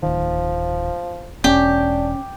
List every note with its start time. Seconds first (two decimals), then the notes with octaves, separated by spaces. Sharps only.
0.03 D1 D#3 F3
1.44 E1 C#4 D4 G4